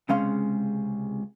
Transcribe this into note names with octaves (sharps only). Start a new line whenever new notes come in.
C#2 C3 G#3 C#4 F5 C6